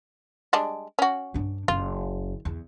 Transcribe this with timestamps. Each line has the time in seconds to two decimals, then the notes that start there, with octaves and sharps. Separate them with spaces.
0.53 G3 G#3 D4
0.99 C#4 F#4
1.34 G2 D4
1.68 F#1 F4
2.45 E2